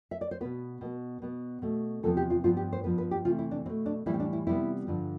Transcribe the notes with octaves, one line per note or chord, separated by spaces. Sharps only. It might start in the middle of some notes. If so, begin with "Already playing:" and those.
E5
D5
C5
B2 B3 B4
B2 B3
B2 B3
B2 A3
E2 C3 F3 B3 A4
G4
F4
G2 F3 B3 F4
G4
C5
G2 F3 B3 B4
B4
G4
C3 E3 A3 F4
E4
D4
B2 A3 C4
D4
A2 E3 G3 E4
C4
D4
E4
C3 G3 B3 E4
G2 D3 F3